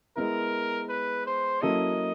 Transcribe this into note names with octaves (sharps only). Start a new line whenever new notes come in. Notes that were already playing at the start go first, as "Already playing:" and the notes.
G#3 B3 E4 A#4
B4
C5
F#3 A#3 C#4 E4 A4 D#5